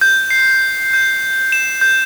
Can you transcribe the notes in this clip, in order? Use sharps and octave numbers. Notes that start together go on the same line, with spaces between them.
G6
C7
G6
E7
G6